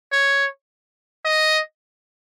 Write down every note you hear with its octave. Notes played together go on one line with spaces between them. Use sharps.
C#5
D#5